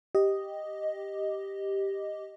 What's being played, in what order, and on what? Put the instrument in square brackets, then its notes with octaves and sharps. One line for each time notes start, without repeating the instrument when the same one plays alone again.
[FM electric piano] G4 D#5